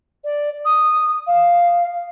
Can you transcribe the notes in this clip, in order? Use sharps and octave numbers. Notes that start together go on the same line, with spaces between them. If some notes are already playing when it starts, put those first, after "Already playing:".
D5
D#6
F5